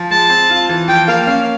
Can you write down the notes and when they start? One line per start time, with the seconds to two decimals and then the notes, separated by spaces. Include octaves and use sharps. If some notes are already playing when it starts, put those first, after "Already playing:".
Already playing: F3
0.10 G#3 A5
0.29 C4
0.50 F4
0.69 E3
0.88 F3 G5
1.08 A#3 F5
1.27 C#4 F5